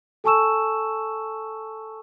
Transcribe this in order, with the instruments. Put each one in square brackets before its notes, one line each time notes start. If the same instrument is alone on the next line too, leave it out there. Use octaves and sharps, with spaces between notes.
[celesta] A4 G#5 A5 C#6 E6 E7